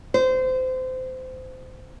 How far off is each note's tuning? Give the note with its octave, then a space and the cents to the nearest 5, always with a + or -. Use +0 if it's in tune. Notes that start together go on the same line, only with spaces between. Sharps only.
C5 -25